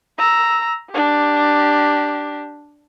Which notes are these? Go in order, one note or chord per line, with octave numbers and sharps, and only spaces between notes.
A#5 E6
D4 G4